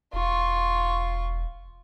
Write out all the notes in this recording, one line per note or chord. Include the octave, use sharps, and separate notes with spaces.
E1 F4 C#6